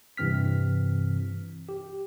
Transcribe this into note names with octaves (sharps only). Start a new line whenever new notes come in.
G2 C3 E3 C4 F6 B6
G4